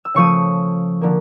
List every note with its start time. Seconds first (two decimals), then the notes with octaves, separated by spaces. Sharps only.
0.05 E6
0.14 C#3 F3 A3 C#6 D#6
1.01 D3 F3 A#3